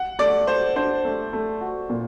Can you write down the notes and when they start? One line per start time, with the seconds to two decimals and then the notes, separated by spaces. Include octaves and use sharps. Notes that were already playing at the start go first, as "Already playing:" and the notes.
Already playing: F#5
0.19 A3 D5
0.47 A4 C5
0.76 D4 C5
1.05 A3
1.33 A3
1.61 F#4
1.90 A#2